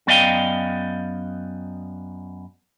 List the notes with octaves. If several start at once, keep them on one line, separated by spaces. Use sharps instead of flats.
F#2 B3 D5 D#5 F5 G5